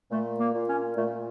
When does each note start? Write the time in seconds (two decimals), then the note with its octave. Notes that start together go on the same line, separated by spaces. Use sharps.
0.11 A#2 A3
0.40 A#3
0.55 A#2
0.69 C#4
0.97 A#2 A3